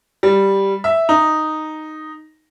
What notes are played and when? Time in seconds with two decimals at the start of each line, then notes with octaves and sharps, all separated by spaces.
0.23 G3
0.84 E5
1.09 D#4